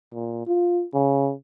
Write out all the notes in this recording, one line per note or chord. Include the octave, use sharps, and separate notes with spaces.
A#2
F4
C#3